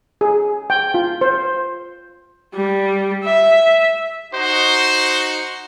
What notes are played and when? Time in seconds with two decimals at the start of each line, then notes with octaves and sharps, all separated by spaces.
0.21 G#4
0.70 G5
0.94 F4
1.21 C5
2.54 G3
3.25 E5
4.34 D#4 F#4 C5